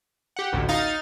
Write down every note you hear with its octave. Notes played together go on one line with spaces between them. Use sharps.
G4 F#5
A1 D2 A2
D#4 F5 A6